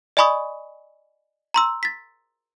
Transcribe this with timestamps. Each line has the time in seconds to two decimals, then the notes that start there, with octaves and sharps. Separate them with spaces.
0.17 D5 D#5 G#5 B5 C#6 D#6
1.54 A#5 C6 E6
1.83 A6 B6